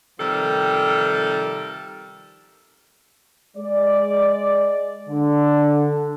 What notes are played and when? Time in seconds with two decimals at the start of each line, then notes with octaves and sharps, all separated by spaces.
0.19 C3 D#3 F3 G3 A4 A#4
3.57 G#3 D5
5.09 D3